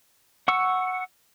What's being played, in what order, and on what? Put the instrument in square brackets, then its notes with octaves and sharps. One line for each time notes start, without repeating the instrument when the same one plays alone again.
[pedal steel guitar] F#5 C#6 E6